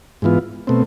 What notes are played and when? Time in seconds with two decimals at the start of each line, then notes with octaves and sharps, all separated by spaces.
0.22 G#2 E3 B3 F4
0.67 B2 A3 C4